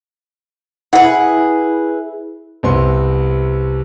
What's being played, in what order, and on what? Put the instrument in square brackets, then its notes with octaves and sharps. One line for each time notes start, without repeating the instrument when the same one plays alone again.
[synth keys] E4 [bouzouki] G#4 B4 [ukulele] F#5
[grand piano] C2 C3 B3 C6